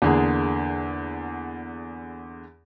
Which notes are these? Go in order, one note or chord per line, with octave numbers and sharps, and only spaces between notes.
E2 D3 A#3 G#4